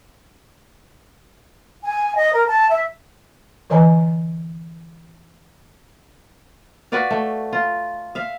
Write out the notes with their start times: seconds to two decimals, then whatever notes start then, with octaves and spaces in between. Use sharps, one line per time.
1.83 G#5
2.17 D#5
2.33 A#4
2.49 A5
2.70 E5
3.70 D3 E3 B4 D#5 G#5 A#5
6.92 F#4 B4 D5 F5
7.11 A3
7.53 F4
8.15 E5 F5